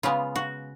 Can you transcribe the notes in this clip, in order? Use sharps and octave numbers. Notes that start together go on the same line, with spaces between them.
C#3 G#3 B3 F4
F#4